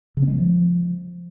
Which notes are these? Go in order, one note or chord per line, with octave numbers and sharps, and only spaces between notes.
C#3
C4
G#3
F#3
F3